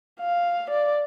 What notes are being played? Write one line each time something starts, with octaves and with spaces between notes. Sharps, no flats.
F5
D5